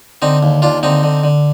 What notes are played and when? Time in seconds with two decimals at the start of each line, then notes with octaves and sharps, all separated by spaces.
0.22 D3 C4 D#4
0.43 D#2
0.62 D#2 D4 F4
0.83 D3 C4 D#4
1.03 D3
1.24 D3